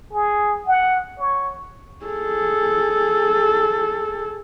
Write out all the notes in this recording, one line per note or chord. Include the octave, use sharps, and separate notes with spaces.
G#4
F#5
C#5
G#4 A4